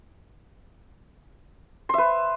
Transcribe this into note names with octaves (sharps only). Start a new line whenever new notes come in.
B4 E5 C6